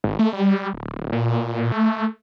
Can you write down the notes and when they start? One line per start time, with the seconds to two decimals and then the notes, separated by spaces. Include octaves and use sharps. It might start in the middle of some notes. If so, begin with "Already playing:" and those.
0.04 G#1
0.19 A3
0.33 G3
0.73 D1
1.12 A#2
1.72 A3